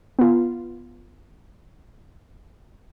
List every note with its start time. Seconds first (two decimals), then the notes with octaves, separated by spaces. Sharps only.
0.19 B3 F4